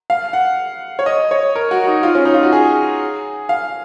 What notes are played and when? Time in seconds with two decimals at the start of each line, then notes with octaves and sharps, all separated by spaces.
0.10 F5
0.33 F#5
0.99 C#5
1.06 D#5
1.31 C#5
1.56 A#4
1.71 F#4
1.87 D#4
2.03 F4
2.15 C#4
2.25 D#4
2.34 F4
2.43 F#4
2.52 G#4
3.49 F5